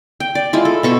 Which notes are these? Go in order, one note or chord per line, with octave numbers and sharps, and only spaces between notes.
G5
D5
G#3 E4 F4
A4
B2 A4 C#6